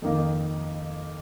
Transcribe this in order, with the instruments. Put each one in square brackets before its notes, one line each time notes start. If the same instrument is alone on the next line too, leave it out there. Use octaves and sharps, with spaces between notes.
[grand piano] F2 D#3 A#3 D#4